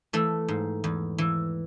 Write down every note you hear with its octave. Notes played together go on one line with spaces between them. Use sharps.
E3 A3
G#2
E2
E3